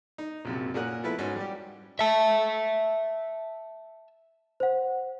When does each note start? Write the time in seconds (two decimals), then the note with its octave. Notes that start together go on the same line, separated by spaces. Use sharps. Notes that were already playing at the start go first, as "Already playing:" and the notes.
0.18 D#4
0.45 A#1 F#2 C3
0.74 A#2 C#4 G#4 A#4 F#5 F#6
1.03 F3 A3 B3 E4 B4
1.18 G#2 C#4 D#4 F#4
1.36 G3 G4
1.99 E5 A5
4.60 C5 F#5